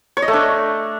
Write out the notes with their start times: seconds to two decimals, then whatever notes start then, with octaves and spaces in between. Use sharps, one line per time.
0.17 C#5
0.22 D#5
0.28 A3
0.33 D4